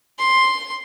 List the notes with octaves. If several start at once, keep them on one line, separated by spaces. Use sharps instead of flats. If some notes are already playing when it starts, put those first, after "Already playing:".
C6